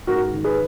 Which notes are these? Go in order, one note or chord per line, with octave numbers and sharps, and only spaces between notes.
G#2 F#4 A#4
D#3
G#4 B4